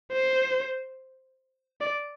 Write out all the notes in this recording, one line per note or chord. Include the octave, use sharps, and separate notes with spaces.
C5
D5